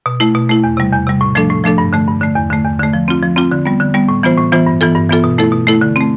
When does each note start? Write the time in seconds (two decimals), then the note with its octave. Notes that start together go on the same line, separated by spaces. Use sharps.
0.06 B2
0.20 A3 E4
0.35 B2
0.49 A3 E4
0.64 E2
0.77 C3 G3
0.92 E2
1.07 C3 G3
1.21 A2
1.35 F3 A3 D4 A4
1.50 A2
1.64 F3 A3 D4 A4
1.78 G2
1.93 D3 A3
2.07 G2
2.21 D3 A3
2.36 E2
2.50 D3 A3
2.65 E2
2.79 D3 A3
2.93 F3
3.08 C4 F4
3.22 F3
3.36 C4 F4
3.51 D3
3.66 G3 B3
3.80 D3
3.94 G3 B3
4.09 A2
4.23 E3 B3 F4 C5
4.38 A2
4.52 E3 B3 F4 C5
4.66 G2
4.81 E3 B3 F4 A4
4.95 G2
5.09 E3 B3 F4 A4
5.24 B2
5.38 A3 E4 A4
5.52 B2
5.67 A3 E4 A4
5.81 D3
5.96 A3 C4